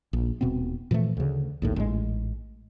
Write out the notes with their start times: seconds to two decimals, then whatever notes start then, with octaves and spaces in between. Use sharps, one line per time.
0.13 A#1
0.41 D#1 B2 B3 C4
0.91 A#2 E3 F3 A3
1.17 D2 C#3
1.62 A#1 D#2 A2
1.76 A1 G#2 G#3